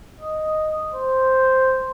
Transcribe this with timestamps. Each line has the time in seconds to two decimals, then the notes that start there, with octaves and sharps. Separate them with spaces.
0.20 D#5
0.94 C5